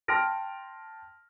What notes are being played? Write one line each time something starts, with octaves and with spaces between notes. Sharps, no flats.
G5 A5 C6 F6 A#6 D7